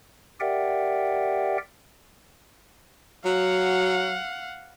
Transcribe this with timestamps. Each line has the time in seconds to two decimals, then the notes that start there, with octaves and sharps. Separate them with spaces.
0.40 G4 A#4 D5 E5 F#5 G5
3.25 F#3 F5 F#5